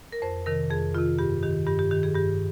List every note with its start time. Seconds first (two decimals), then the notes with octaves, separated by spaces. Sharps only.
0.12 A#4
0.22 F2 C5
0.46 C3 D#3 A#4
0.70 F2 G#4
0.95 C3 D#3 F4
1.19 G2 G4
1.43 D#3 G4
1.67 G2 G4
1.79 G4
1.91 D#3 G4
2.03 G#4
2.15 G2 G4